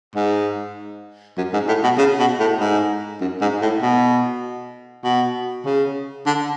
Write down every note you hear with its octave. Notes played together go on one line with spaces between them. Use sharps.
G#2
F#2
G#2
A2
B2
C#3
B2
A2
G#2
F#2
G#2
A2
B2
B2
C#3
D3